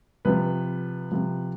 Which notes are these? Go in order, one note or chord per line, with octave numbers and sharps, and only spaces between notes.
C3 F3 B4
C3 F3